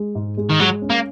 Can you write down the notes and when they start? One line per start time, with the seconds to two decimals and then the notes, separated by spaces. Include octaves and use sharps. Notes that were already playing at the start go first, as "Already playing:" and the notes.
Already playing: G#3
0.15 G#2
0.37 G#3
0.50 D#3
0.60 F#3 G#3
0.82 C#4
0.90 A#3